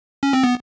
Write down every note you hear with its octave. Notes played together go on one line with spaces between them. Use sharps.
C#4
C4
B3